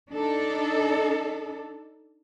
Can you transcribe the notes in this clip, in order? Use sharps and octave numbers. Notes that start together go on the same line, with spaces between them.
D4 D#4 A4